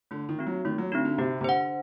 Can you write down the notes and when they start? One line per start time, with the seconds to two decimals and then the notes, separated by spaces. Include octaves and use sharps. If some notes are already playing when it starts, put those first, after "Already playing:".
0.11 D3 A3
0.29 D#3
0.39 C4 D#4 F#4
0.47 F#3
0.65 D#3 A3
0.78 F#3
0.92 D3 C4 D#4 F#4
1.05 D3
1.18 C3 G4
1.41 C3
1.44 D3 C5 F#5